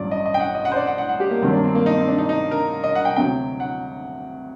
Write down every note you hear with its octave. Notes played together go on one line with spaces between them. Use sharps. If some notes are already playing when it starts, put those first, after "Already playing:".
Already playing: A1 G2 F#3 D5
D#5
D#5
G5
F#5
D#5
F#5
C5
D5
F#5
F#5
F#5
G4
A#3
G2 D#3 F#3 A#3 C4
D4
C4
A#3
D#4
C4
D4
D#4
D#4
A#4
D#5
F#5
G5
D2 C3 F#3 G5
F#5